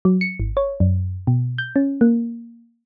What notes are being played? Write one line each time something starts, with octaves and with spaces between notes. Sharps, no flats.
F#3
C#7
G#1
C#5
F#2
B2
G6
C#4
A#3